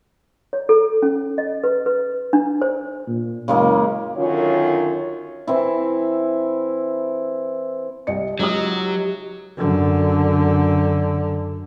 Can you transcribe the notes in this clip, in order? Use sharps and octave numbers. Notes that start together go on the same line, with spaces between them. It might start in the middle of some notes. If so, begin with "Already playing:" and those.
C#5
A4
C#4
D#5
B4
B4
D4
C5
A#2
F#1 C#3 G#3 A#3
F#2 D3 D#3 F4 C#5
E3 C4 E4
C2 D#5 C#7
C#2 F#3 D#4 G4 E5 D#6
F#2 D3